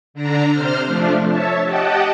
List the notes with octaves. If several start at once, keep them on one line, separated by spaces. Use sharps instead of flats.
D3 D4 A#5
C3 C5 F6
F3 A3 D4
C#5 E5 A5
G4 D#5 F#5 G5 A5